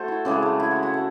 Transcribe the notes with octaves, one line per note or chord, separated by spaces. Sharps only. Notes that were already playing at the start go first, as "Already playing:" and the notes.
Already playing: A3 F#4 A4 C5
E4
C#3 E3 G#3 C4
A3
E4
F#4
F#4
A3